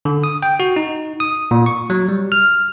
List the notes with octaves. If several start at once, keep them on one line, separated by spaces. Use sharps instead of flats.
D3
D#6
G5
F#4
D#4
D#6
A#2
C#6
F#3
G3
F6